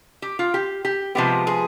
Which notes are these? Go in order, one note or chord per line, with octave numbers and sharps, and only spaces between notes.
G4
F4
G4
G4
C3 F3 G#3 B3 G4
G#4